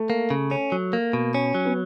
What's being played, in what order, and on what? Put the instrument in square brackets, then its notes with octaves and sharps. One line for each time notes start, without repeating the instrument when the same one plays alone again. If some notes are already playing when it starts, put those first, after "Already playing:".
Already playing: [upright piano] A3
[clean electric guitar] A#3
C#3
C#4
F#3
A#3
B2
C#4
F#3
[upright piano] B3